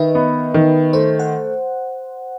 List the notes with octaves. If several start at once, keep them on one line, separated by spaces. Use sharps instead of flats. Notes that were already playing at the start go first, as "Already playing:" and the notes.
Already playing: D#3 B4 D#5 E5
B3
D#3
A3 C5
F#5